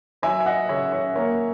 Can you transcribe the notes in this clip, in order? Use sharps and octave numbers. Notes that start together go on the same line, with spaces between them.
F#3 E5 G#5
G#5
D#5 F#5
C#3 C#5 E5
C#5 E5
A#3 A#4 C#5